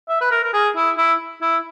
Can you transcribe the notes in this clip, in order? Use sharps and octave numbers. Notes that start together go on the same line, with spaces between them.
E5
B4
A#4
A#4
G#4
E4
E4
E4